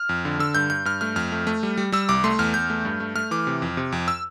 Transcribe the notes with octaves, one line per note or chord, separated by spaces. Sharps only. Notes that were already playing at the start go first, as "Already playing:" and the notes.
Already playing: F6
F2
D3
D3 E6
G2 G6
G2 G6
G2 F6
A3 F6
F2 F6
A3
A3
G3
G3
G3 E6
C2 D6
A3 C6
E2 F6
E2 G6
A3
G2
A3
A3 F6
E3 D6
C3
F2
C3
F2
E6